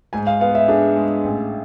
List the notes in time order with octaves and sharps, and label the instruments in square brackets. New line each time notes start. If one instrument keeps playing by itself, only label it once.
[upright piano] G#2 [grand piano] G#5
[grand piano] F5
[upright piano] B3 [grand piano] F5
[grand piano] E5
[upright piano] D4 [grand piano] G#4
[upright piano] G#3
A1